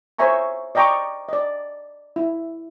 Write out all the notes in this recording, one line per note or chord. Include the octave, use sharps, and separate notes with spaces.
C5 C#5 E5 G#5 A#5 C#6
D5 D#5 G5 A#5 C#6 D6
D5 D#5
E4